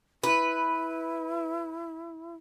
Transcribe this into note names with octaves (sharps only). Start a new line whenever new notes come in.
E4 B4